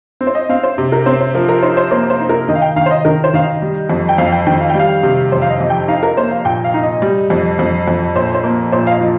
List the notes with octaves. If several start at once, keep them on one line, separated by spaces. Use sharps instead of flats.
C4
C5
D#5
C4 F5
C5
C3
A#4
C4 C5
C5
F3 A#4
A#4
D#4 C5
C5
A#3 C5
C5
D#4
A#4
D#3 D#5
F5
G5
D#3 F5
C5
D#5
D#3 A#4
C5
D#3 F5
D#5
G3
F2
G5
F2 F5
G5
D#3 G5
F5
G5
G3
F5
C3
F2 C5
F5
D#5
F2
G5
D#4 F5
A#4
A#3 C5
F5
A#2 G5
F5
D#4
D#5
G3
F2
F2
F2
A#2 C5
C5
A#3
A#2 C5
F5
D#5
F3